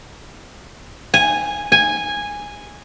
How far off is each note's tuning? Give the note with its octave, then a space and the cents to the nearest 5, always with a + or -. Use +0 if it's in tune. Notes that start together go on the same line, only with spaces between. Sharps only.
G#5 -10
G#5 -10